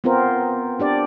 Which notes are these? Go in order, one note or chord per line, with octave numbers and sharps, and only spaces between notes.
B3 C4 F4 A#4 C5
D4 G4 D5